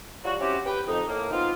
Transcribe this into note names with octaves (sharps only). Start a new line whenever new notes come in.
F#3 G3 F4 F#4
C4 C#4 E4 F#4 G4
G4 B4 G5
F2 D#4
A2 A#3
B3 C4 D#4 F4